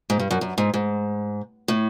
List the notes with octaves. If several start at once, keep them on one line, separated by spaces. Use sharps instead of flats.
G#2
G2
F#2
F#2
G#2
G#2
A2